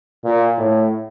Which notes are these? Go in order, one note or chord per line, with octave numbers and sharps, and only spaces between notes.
A#2
A2